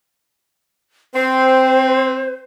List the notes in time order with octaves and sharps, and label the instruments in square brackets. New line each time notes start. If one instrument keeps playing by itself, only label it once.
[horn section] C4 [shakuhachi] C5